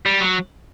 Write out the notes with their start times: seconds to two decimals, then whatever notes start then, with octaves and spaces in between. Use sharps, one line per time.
0.06 G3
0.21 F#3